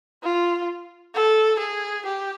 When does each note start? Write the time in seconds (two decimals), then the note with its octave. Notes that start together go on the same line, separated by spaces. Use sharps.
0.23 F4
1.15 A4
1.60 G#4
2.05 G4